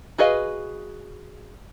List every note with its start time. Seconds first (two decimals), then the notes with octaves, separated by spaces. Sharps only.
0.18 F#4 G#4 B4 D#5 F5